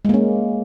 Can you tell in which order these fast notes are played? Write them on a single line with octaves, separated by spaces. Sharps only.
G#3 A#3 C#4